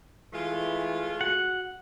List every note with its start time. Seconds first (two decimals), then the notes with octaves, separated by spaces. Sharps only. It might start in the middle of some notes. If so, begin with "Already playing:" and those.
0.34 E3 G#3 A3 F4
1.21 F#4 F#5